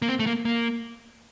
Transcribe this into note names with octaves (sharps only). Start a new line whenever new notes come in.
A#3
C4
A3
A#3
A#3